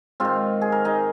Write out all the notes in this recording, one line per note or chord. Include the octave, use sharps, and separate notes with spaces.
G#2 D#3 C4 F4
G#4
A#4
D#4 G#4